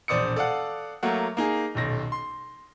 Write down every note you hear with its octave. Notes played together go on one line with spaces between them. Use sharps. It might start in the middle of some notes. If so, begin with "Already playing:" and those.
E1 A#1 C5 D5 D#6 C#7
A4 D5 F5 F#5
F#3 A3 A#3 F#5
A#3 D#4 G#4
D#1 B1 A#6
C6